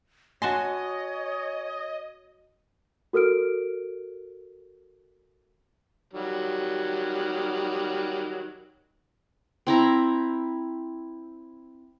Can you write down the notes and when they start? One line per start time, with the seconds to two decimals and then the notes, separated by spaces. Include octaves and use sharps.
0.42 F#4 C#5 D#5 G#5 A5 C6
3.13 F#4 A4 A#4 F6 D7
6.13 D#3 F#3 G3
9.67 C4 E4 A#5